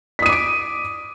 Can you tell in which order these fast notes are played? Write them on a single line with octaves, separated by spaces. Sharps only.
B6 D#6 D#7 D6 D7